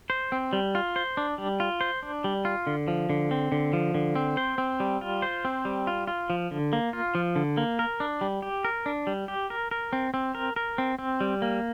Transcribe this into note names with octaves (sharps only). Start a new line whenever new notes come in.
C5
C4
G3
F4
C5
D4
G3
F4
C5
D4
G3
F4
D3
F3
D3
C4
D3
F3
D3
C4
C5
C4
G3
F4
C5
C4
G3
F4
F4
F3
D3
A#3
F4
F3
D3
A#3
A#4
D4
G3
G4
A#4
D4
G3
G4
A#4
A#4
C4
C4
A#4
A#4
C4
C4
G3
A#3